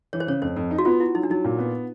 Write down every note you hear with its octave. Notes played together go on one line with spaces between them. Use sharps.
E3 C#5
C5
C#3 C#5
F2 C5
F2
D#4
F#4
B3 F4
E4 F#4
F#3 D#4
D4
F#3 D#4
A#2
B3